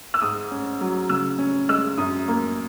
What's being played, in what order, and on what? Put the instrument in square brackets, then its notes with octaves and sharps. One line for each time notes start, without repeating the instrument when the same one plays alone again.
[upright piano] E6
G#2 D#6
C#4
F#3
C#3 E6
C#4
G#3 E6
F#2 D#6
A#3